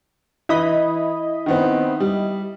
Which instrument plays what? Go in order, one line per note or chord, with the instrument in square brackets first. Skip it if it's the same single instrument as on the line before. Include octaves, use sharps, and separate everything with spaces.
[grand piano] E3 [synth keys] E4 D#5 B5
[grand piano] D#3 B3 C4
G3